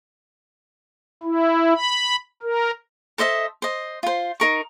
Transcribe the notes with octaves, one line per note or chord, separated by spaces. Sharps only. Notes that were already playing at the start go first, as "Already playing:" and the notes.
E4
B5
A#4
A4 C5 D#5 E5
C5 D#5
F4 C5
D#4 A#4 C#6